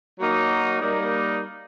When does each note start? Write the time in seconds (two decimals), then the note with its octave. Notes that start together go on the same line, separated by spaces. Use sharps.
0.19 F#3 A#3 D#4
0.81 G3 A#3 D#4